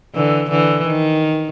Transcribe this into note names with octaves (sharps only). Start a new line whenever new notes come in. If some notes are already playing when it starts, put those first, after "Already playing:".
D3 E3
D3 E3
D#3